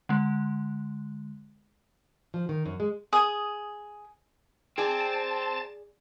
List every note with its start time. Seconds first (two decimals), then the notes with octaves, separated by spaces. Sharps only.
0.09 D3 G#3
2.34 F3
2.49 D#3
2.66 F#2
2.80 G#3
3.13 G#4 D#6
4.78 C4 G#4 D5 A5